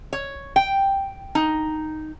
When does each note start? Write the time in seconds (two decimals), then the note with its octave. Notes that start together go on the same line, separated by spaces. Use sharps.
0.13 C#5
0.56 G5
1.35 D#4